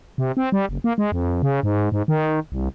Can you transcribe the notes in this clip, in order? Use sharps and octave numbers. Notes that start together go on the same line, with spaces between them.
C3
C4
G3
F#1
A#3
G#3
F2
C#3
G#2
G#2
D#3
C2